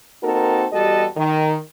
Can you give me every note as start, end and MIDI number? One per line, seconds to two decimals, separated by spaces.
0.23 0.66 58
0.23 0.66 60
0.23 0.66 63
0.23 0.66 66
0.23 0.66 69
0.23 0.66 70
0.73 1.06 40
0.73 1.06 55
0.73 1.06 66
0.73 1.06 67
0.73 1.06 69
0.73 1.06 75
1.17 1.56 51